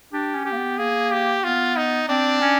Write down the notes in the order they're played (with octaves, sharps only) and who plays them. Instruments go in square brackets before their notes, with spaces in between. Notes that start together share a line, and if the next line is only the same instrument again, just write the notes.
[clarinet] D4 [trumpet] G4
[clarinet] C#4
[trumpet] G4
[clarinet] A#3
B3
[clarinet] A#3 [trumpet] G#4
[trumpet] G4
[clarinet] B3 [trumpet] F4
[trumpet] D#4
[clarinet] C4 [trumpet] D4
[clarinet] C#4